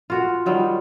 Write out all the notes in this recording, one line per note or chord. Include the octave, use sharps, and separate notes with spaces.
F4 F#4 A#4
D#3 F#3 G3 F4